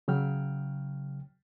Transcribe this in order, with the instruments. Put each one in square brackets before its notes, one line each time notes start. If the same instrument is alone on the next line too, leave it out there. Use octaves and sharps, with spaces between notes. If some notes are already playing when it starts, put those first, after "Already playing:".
[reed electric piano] C#3 F#3 G5 F6